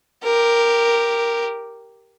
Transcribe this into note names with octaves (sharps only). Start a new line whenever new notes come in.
G4 A#4